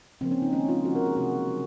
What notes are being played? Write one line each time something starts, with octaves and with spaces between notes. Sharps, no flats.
C#3 F3 A#3 C4
C#4
D#4
D#3 G#3 C#4
F4
C3 F3 A#3 F#4
A#4
G#4
C3 F#3 A#3 F#4
C#3 F#3 A#3